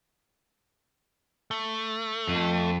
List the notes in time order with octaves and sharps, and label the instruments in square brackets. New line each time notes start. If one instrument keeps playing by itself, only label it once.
[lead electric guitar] A3
[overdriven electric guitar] F2